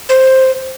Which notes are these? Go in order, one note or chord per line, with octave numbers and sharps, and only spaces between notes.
C5